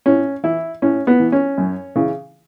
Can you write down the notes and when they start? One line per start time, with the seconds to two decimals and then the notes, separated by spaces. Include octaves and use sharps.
0.06 A2 C#4
0.43 E3 E4
0.82 A2 C#4
1.07 B3
1.20 E3
1.32 C#4
1.58 F#2
1.95 C#3 E3